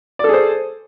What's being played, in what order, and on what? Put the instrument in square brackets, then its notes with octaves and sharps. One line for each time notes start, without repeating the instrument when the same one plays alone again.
[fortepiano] D5
A4
G#4
C5